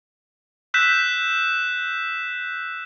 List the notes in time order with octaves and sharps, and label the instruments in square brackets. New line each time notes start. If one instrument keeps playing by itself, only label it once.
[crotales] E6 F#6 G6 B6 E7